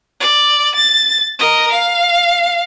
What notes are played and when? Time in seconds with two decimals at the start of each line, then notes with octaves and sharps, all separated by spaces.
0.20 D5
0.75 A6
1.39 A#4 D#5
1.72 F5